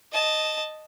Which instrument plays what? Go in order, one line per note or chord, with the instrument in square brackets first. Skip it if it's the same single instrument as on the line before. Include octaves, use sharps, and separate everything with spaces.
[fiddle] D#5 A5